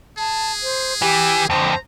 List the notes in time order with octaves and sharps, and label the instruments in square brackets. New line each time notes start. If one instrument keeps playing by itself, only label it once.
[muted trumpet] G#4 [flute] A5
[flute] C5
[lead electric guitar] E3 [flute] G4
[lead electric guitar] F2 D3 [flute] C5 [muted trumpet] A#5